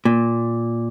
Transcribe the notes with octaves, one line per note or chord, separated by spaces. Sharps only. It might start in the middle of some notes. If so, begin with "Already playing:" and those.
A#2